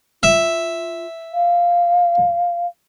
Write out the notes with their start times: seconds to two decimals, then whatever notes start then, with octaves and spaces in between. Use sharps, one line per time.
0.23 F4 E5
1.33 F5